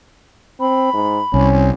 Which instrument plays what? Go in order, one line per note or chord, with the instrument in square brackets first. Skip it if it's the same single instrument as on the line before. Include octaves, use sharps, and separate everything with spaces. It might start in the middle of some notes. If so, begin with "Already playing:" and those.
[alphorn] C4 [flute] B5
[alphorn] G#2
[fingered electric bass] C2 [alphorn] C#4